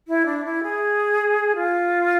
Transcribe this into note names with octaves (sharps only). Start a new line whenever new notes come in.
E4
D4
E4
G#4
F4